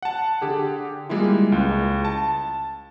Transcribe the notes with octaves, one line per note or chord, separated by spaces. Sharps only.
F#5 A5
D3 G4 G#4
G3 G#3 A#3 E4 F4
C#2
A5